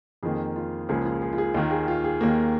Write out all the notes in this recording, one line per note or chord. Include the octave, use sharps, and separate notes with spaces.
F2 D#3 A#3 G#4
F4
C#2 C#3 F3 A#3 G#4
F4
G#4
F4
G#4
D#2 D#3 A#3 F4
G#4
F4
G#4
D#2 D#3 A#3